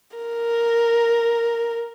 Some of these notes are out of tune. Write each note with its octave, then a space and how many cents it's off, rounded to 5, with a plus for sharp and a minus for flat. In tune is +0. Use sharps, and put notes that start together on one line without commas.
A#4 +0